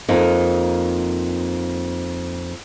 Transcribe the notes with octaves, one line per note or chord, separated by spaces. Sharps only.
F2 A#3 D#4